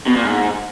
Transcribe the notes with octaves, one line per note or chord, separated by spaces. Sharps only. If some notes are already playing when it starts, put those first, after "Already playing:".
B2
A#2
G#2